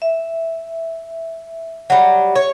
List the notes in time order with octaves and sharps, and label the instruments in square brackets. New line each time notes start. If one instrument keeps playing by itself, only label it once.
[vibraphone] E5
[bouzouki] F#3 G3
C#5